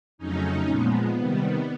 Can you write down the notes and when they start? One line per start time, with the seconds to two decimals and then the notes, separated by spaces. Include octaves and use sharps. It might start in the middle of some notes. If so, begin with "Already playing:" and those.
0.18 F2 C#3 F#3 A3 C#4 D#4
0.68 A#2 F3 G#3 B3
1.17 C3 D#3 G3